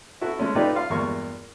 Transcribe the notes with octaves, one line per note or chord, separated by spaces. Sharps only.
E4 F#4 A4
G#3 A3 C#4
A3 D#4 F4 G4 B4 D5
F4 F5
E2 G2 G#3 A#3 F4 C#6